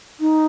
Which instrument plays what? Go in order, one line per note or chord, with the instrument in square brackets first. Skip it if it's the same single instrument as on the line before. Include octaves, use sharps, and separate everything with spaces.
[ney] D#4